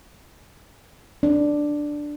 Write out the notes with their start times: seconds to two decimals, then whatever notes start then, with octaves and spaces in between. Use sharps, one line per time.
1.23 D4